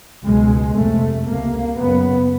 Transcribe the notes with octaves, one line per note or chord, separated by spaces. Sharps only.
C#2 B2 G#3
F2 C3 A3
C#2 C3 A#3
F#2 C#3 B3